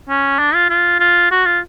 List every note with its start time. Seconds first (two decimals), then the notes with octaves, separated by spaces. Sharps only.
0.09 C#4
0.39 D4
0.54 F4
0.70 F4
1.00 F4
1.31 F#4
1.46 F4